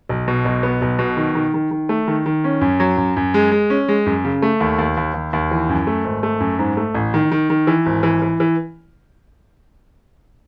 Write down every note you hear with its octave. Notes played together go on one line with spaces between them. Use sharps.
B1
B2
B1
B3
B1
B2
D#3
D#3
D#3
D#3
A3
D#3
D#3
C#4
F#2
F#3
F#2
F#2
G#3
G#3
C#4
G#3
F#2
C#3
A3
D#2
D#2
D#2
D#2
D#2
E3
F#2
A3
G#1
A3
F#2
G#2
A3
A1
D#3
D#3
D#3
E3
G#1
E3
E3
E3